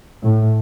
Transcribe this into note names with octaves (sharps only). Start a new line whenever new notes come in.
A2